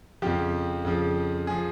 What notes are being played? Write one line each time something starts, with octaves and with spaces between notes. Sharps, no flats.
F2 C#3 F3 G4
F2 C#3 F3
F3 G#4